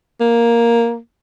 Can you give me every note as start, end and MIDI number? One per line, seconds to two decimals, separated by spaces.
0.21 0.97 58